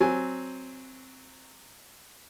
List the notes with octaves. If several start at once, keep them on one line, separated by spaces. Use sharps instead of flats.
F#3 C4 G#5